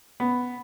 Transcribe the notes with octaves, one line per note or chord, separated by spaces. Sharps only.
B3